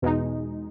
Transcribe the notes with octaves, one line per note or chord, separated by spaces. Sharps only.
E2 B2 G#3 D#4